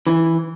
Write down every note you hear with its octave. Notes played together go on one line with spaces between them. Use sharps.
E3